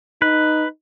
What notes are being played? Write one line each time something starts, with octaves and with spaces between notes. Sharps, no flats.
D#4 B4